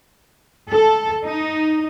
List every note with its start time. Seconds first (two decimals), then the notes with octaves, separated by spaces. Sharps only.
0.69 A4
1.24 D#4